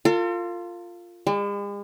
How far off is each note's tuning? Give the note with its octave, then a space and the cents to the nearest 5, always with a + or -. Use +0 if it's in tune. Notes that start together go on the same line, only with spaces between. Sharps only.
F4 +0 A4 +45
G#3 -45 D5 +40